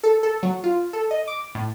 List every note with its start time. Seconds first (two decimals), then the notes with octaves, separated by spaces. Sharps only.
0.04 A4
0.23 A4
0.43 F#3
0.64 F4
0.93 A4
1.11 D#5
1.28 D6
1.55 A2